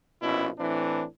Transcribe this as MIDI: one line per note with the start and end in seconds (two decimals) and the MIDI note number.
0.22 0.49 34
0.22 0.49 47
0.22 0.49 61
0.22 0.49 64
0.58 1.04 45
0.58 1.04 52
0.58 1.04 60
0.58 1.04 62